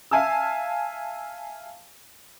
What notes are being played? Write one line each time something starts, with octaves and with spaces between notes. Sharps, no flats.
E5 F5 G#5 A5 E6